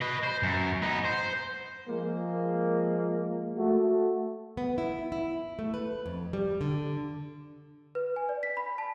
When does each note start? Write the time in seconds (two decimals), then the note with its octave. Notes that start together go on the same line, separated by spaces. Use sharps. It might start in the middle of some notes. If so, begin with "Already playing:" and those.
0.02 B4 D#5
0.24 C5
0.43 F#2
0.82 B3 D#4
1.05 C5
1.88 F3 G#3 A#3
3.56 A3 F#4
4.57 B3
4.78 E4
5.12 E4
5.59 A3
5.74 B4
6.06 F2
6.33 G3
6.61 D3
7.95 B4
8.16 G#5
8.29 D5
8.43 B6
8.57 B5
8.78 A5